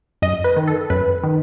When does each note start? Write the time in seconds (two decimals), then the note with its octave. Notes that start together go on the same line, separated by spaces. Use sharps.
0.22 F#2 D#5
0.44 B4
0.56 D#3
0.68 A4
0.90 F#2 B4
1.24 D#3